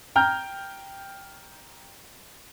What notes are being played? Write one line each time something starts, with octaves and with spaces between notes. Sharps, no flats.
G5 A#5 F6 G6